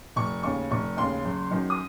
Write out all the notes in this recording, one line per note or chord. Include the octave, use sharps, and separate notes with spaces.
F1 C#6
D#2 C#3 C#6
F1 C#6
D#2 C#3 C6
F#1
F#2 D#3
D#6